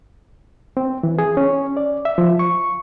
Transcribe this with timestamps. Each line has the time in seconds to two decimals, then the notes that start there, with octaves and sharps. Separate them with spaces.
0.77 C4
1.03 E3
1.19 G#4
1.37 C#4
1.77 D5
2.05 E5
2.18 F3
2.39 C#6